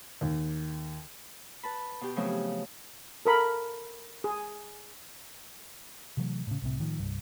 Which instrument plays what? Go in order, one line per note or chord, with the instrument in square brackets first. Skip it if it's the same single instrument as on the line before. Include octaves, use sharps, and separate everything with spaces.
[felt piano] D#2
[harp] B4 A5 B5
B2 G4
C#3 F3 F#3 A3 B3 C4
[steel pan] A4 A#4 B5
G#4
[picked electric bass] C3 E3 F#3 A3
A2 C#3
C2 A2 C3
A2 D#3 F3
C2 G2